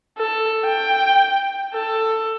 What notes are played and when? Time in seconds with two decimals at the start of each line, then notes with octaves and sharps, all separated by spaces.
0.18 A4
0.66 G5
1.74 A4